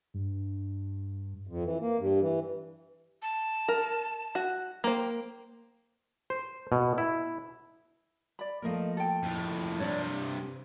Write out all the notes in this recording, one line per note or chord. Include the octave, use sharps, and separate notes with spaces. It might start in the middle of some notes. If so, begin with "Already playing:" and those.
G2
F2
E3
A#3
G2
E3
A5
A#4
F#4
A#3 C5 G5
C5
B2
E4
D5 B5
F3 A3 A#3 A#4 D#5
A4 G5
F2 A2
G2 C3 A4 C#5 D5
C5